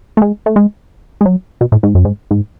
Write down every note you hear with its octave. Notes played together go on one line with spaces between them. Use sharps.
A3
G#3
A3
G#3
G#3
F#3
B2
A2
G#2
F#2
G#2
G#2